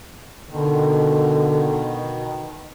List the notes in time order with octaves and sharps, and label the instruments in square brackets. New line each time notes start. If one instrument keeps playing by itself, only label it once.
[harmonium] B2 D#3 [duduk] D3